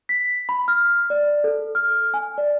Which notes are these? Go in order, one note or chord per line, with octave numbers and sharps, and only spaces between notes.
B6
B5
F6
D5
A4
F6
G#5
D5